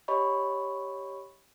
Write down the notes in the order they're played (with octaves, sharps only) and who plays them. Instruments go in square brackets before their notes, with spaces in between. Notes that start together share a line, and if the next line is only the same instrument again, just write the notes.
[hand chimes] G4 C#5 D#5 B5 C#6